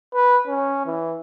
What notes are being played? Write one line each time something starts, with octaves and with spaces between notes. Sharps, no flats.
B4
C#4
E3